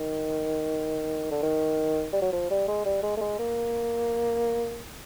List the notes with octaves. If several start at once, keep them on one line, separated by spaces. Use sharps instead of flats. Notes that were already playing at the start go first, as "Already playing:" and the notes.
Already playing: D#3
D3
D#3
G3
F#3
F3
G3
G#3
G3
G#3
A3
G#3
A#3